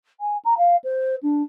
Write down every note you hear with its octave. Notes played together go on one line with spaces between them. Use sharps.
G#5
A#5
F5
C5
D4